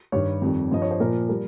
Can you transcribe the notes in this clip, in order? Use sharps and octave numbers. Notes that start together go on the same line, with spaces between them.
G2 D#3 G3 C#5
F2 D#3 G3
G2 F3 D#5
C#5
C5
A#2 F3 A#4
G3 A#4